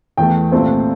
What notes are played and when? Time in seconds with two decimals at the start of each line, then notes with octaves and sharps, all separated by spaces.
0.17 E2 E3 A3 G5
0.52 C2 A#2 A3 C4